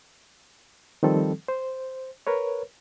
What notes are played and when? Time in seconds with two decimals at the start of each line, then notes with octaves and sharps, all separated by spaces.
1.03 D#3 F3 G3 C4 A4
1.48 C5
2.27 A#4 B4 C#5